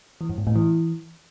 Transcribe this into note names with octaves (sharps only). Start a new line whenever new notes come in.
E3
G2
G#2
A2
E3